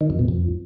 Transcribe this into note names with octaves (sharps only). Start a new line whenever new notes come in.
D#3
F2
B2
F2